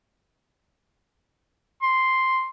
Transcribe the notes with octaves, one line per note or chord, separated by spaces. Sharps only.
C6